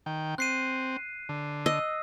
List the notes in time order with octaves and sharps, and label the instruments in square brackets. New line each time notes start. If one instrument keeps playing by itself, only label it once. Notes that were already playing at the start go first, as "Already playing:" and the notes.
[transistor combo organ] D#3 G5
[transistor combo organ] C4 [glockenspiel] F#6 C7 D#7
[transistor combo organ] D3
[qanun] D#5 [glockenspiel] E6